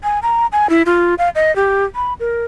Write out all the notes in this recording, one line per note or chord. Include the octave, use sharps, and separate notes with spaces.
G#5
A#5
G#5
E4
F4
F5
D#5
G4
B5
A#4